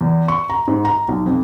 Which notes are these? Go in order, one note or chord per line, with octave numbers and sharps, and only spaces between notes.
E2
C#6
A#5
G#2
A#5
B1
F2